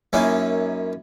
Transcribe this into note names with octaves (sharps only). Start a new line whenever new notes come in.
F#2 A#3 C#4 D#4 E4